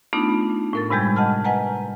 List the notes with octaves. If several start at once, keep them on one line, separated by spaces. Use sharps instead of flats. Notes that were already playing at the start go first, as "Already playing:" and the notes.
A3 B3 D4 D#4 F4
A2 A#4 A6
G2 C3 G3 G#3 G6 G#6
D#5 F#5 A5 F6
B4 D#5 F#5 G#5 A#5